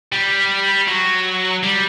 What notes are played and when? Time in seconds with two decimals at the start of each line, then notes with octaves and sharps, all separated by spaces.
0.13 G3
0.88 F#3
1.63 G3